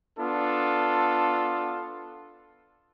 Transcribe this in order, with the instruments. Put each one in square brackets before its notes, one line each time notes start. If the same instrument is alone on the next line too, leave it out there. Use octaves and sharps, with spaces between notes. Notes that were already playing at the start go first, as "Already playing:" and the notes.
[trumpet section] B3 D4 F4 A4